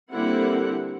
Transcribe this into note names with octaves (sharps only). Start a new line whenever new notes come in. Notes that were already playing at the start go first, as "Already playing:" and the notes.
D3 G3 A#3 C4 E4 F#5